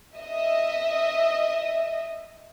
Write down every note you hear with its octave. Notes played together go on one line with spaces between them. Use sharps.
D#5 E5